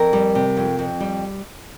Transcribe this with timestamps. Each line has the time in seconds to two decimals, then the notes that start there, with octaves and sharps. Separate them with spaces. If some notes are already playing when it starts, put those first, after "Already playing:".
Already playing: F2 A#4
0.13 G3
0.35 C3
0.57 F2
0.79 F2
1.00 G3